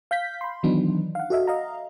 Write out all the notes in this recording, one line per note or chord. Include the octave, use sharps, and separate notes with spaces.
F5 G6 B6
B5 C6
D#3 E3 F#3 B3 D4 D#4
F5 F#5
F#4 A4 D#5 E5
D#5 F5 A#5